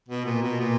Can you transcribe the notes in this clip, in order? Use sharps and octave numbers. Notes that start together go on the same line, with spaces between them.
B2
A#2
B2
A#2